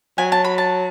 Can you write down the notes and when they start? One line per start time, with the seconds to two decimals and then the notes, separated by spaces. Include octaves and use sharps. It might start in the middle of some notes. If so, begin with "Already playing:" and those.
0.18 F#3 G#5
0.32 A5
0.44 B5
0.58 A5